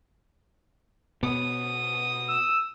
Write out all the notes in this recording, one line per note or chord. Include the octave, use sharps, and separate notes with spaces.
B2 B3 C#5 D#6
E6